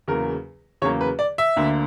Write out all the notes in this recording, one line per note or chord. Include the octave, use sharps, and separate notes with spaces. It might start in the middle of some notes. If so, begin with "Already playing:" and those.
E2 C#3 F#3 A#3 A#4
E2 C#3 F#3 A#3 C#5
B4
D5
E5
D2 D3 A#3